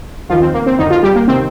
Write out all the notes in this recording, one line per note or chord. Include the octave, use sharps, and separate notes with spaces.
D#2 D#3 F3 F4
C4
A#3
C4
F2 D3 D#3 D#4
F3 F4
G3 G4
A#3
C3 D#3 C4